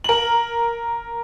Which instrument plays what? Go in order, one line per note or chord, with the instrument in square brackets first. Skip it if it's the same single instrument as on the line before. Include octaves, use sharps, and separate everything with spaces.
[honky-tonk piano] A#4 F#7